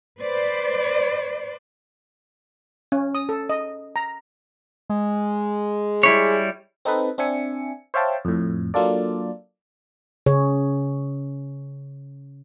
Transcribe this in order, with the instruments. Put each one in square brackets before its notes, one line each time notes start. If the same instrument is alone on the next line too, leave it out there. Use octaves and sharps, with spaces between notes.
[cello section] B4 C5 D5
[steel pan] C#4
D#6
A4
D#5
A#5
[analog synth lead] G#3
[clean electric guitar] G3 E4 C#5
[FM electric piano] C4 D#4 A4 B4
C4 D4 E5 G#5 C#7
C5 C#5 E5 F5 G5 A5
F2 A2
F#3 A#3 D4 F4 A4 D5
[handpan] C#3 G#4 C#5